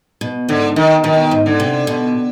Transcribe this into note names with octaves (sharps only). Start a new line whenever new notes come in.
B2
G#2 D3
B2 D#3
B2 D#3
G#2
D3
C3
B2